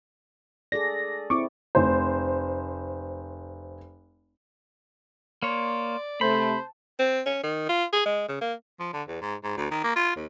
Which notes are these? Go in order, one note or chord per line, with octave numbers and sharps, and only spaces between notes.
G#4 A4 D5 A#6
C4 E4 C#6 D6
F1 C5
A#3 C#5 D5 C6
C3 A3 C5 A5 B5
C4
C#4
D#3
F4
G#4
G#3
C#3
A#3
F3
D3
E2
G#2
G#2
D2
D#3
A#3
F4
D#2